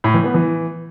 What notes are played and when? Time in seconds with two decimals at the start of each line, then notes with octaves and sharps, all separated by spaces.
0.04 A2
0.14 E3
0.24 B3
0.34 E3